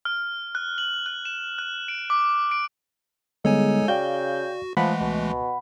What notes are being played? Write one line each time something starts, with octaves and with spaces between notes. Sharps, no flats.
F6
F#6
F#7
F#6
E7
F#6
D7
D6
D7
D3 G3 G#3 B3 D#4 A4 C#5 G#5
C#3 F#4 D5 F5 G5 G6
E3 F3 G#3 A3 F#5 B5
C#2 B2